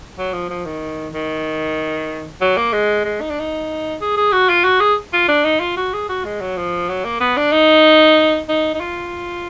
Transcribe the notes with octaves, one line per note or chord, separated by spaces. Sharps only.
F#3
F3
F3
D#3
D#3
F#3
A#3
G#3
G#3
D#4
D4
D#4
G#4
G#4
F#4
F4
F#4
G#4
F4
D4
D#4
F4
F#4
G#4
F#4
G#3
F#3
F3
F#3
A#3
B3
D4
D#4
D#4
D#4
F4